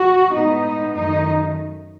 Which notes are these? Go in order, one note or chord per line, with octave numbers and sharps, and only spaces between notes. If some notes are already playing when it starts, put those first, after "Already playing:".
Already playing: F#4
A2 G#3 B3 D#4
F#2 D#3 A3 D#4